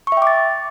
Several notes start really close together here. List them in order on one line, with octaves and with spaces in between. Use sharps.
C#6 E5 G5 D6 A6